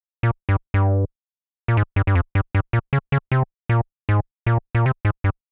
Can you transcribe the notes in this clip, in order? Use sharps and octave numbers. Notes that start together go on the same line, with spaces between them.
A#2
G2
G2
A#2
G#2
G2
G2
F2
G2
G2
A#2
C#3
C#3
C3
A#2
G#2
A#2
A#2
C3
G#2
G2